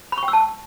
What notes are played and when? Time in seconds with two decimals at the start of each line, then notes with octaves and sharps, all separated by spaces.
0.12 B5
0.18 C#6
0.23 G5
0.28 E6
0.33 A5